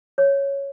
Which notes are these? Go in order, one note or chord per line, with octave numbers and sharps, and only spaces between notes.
C#5